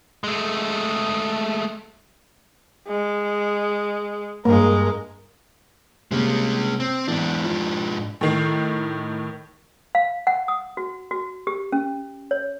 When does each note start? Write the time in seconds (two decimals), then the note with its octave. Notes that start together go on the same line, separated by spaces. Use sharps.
0.24 G#3 A3
2.88 G#3
4.45 G2 G#3 A#3 A#4
6.11 C3 G3 G#3 A#3 C#4
6.80 C4
7.08 G#2 E3 B3 D4
7.44 F3
8.21 A2 D#3 C7
9.95 F5
10.27 F#5
10.48 D#6
10.77 F#4
11.11 F#4
11.47 G4
11.72 C#4
12.31 C#5